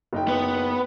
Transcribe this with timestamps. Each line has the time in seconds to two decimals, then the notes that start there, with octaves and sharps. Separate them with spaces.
0.13 F#1 D#4 G5
0.28 B3